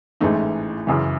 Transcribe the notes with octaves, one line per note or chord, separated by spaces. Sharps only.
A1 G#2 E3 A3 D#4
F#2 C#3 E3